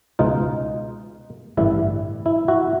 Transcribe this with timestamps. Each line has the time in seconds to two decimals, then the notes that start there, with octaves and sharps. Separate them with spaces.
0.19 C#2 B2 G#3 D#4 F4
1.57 A1 G2 D3 G3 E4
2.26 E4
2.48 E4 F#4